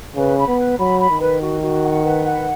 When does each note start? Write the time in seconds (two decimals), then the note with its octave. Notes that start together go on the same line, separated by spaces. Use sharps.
0.16 C#3 B4
0.37 B5
0.48 B3
0.58 B4
0.78 F#3 B5
1.00 B5
1.10 D#3
1.20 B4
1.41 F#4
1.62 F#4
1.84 F#5
2.03 B4
2.25 F#5